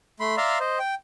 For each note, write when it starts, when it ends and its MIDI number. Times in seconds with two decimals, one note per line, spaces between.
0.20 0.36 57
0.20 0.36 83
0.20 0.36 84
0.37 0.58 74
0.37 0.58 76
0.37 0.58 77
0.37 0.58 82
0.37 0.58 84
0.60 0.79 72
0.60 0.79 75
0.79 0.95 79